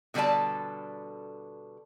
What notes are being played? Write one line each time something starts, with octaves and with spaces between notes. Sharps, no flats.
B2 D3 G3 A4 D5 A5